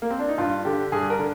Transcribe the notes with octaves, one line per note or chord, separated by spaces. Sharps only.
A#3
C4
D4
D#4
G2 F4
D3 G4
G2 G#4
A#4
D3